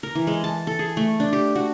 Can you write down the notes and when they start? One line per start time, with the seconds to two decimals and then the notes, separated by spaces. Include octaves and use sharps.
0.03 A#4
0.15 E3
0.27 G#3
0.44 A5
0.67 A4
0.79 G#4
0.97 A3
1.20 D4
1.33 G4
1.56 F#4